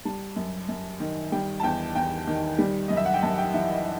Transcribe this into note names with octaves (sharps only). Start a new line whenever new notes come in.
G3 A5
F#2
F#2
D#3
G3 G5
A5
E2 G5
E2 G5
D#3
G3
F#2 D#5
E5
F#5
G5
F#2 A5
G5
E3 E5
D#5